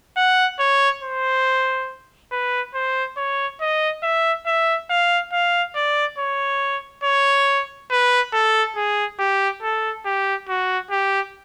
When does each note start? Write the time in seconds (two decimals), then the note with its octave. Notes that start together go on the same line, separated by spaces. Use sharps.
0.17 F#5
0.60 C#5
1.03 C5
2.32 B4
2.75 C5
3.17 C#5
3.61 D#5
4.03 E5
4.46 E5
4.90 F5
5.33 F5
5.76 D5
6.19 C#5
7.04 C#5
7.91 B4
8.33 A4
8.76 G#4
9.19 G4
9.63 A4
10.05 G4
10.49 F#4
10.91 G4